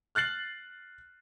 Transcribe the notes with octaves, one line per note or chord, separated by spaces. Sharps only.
F6 F#6 A6 C7 F#7